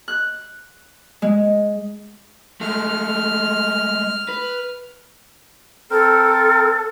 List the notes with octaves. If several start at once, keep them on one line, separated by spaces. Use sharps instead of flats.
F#6
G#3
G#3 A3 F6
B4
C4 A4 A#4